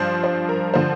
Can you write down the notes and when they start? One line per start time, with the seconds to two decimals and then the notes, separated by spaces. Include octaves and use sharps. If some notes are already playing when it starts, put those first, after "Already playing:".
Already playing: G2 F3 C5
0.24 C5
0.49 A#4
0.74 D3 F3 C5